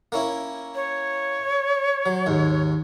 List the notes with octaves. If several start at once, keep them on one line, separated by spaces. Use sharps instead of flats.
A#3 C#4 E4
C#5
F#3
D#2 G#2